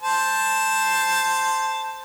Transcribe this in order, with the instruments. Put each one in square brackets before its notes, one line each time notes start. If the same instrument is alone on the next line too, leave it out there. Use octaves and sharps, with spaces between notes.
[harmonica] C5 A5